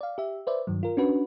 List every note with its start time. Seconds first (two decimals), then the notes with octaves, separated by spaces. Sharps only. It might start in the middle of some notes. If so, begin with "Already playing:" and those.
0.01 D5 F5
0.18 G4 E5
0.47 B4 C5 D5 E5
0.67 G2 D#3 F#3
0.83 F4 A#4
0.97 C#4 D4 F#4 B4